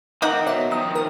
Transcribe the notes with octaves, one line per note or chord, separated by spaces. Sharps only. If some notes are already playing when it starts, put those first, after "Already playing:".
D#3 A#3 C4 D#4 F#5 D6
B2 C5 C#5 E5
D#3 F3 A#5 D#6
A#4